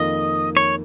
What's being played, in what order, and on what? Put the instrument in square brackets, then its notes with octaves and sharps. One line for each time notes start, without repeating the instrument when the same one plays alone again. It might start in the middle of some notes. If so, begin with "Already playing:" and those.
Already playing: [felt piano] F2 D#3 A#3 F4 [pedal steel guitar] D#5
[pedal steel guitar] C#5